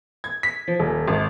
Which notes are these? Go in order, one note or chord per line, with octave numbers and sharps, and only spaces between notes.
G#6
B6
F3
D#1
G#1